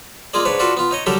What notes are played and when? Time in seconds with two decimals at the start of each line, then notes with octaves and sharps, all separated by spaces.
0.34 G#3 A#3 F4 G#4 D5
0.45 G#2 D4 B4 C#5
0.60 D4 F4 F#4 A4 B4
0.77 B3 F4
0.91 D#4 C#5 D#5
1.06 D3 F#3 G3 G4 A4 A#4